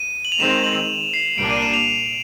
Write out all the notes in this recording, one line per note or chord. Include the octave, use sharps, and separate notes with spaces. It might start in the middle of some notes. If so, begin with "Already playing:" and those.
Already playing: D#7
F#7
F7
D#3 G#3 C4 E7
F#7
C7
C2 A#2 G3 A#3 D4 D7
D#7
E7
F7